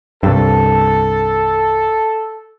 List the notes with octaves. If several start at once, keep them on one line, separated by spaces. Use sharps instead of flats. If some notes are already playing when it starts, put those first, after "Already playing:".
C2 G2 A4